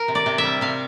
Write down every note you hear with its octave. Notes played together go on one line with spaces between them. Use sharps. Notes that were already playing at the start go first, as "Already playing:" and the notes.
Already playing: A#4
C3
D5
C3
E5
G3
C3 F5